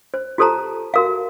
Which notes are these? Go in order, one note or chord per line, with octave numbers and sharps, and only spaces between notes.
C5
F4 G4 A4 C5 A5 A#5
F#4 A#4 F5